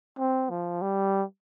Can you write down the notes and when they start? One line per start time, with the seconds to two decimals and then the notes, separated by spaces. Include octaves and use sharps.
0.19 C4
0.50 F3
0.81 G3